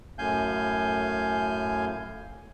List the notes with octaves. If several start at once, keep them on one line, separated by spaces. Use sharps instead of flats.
F#2 A2 F5 G#5 G6